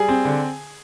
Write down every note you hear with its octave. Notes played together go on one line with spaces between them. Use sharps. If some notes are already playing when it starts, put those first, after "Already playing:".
Already playing: G3 G#4
C4
D3